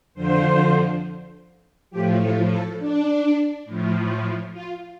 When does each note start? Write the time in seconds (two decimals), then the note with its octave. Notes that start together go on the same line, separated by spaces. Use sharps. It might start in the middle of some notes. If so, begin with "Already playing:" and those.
0.14 F2 D3 F3 C5
1.91 A2 F3 G4
2.20 A4
2.48 A4
2.79 D4
3.65 A2 F3
4.53 F4